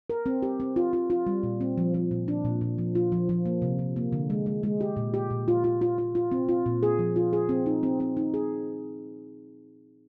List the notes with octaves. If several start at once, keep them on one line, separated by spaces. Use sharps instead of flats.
A#4
C4
G4
C4
F4
F4
F4
G3
A#2
C4
F3
F3
A#2
D4
A#2
A#2
F3
F4
F3
F3
A#3
C3
C3
A#3
D3
G#3
G#3
G#3
G4
A#2
G4
A#2
F4
F4
F4
F4
F4
C4
F4
A#2
G#4
F3
F4
G#4
C4
D#4
C4
C4
D#4
G#4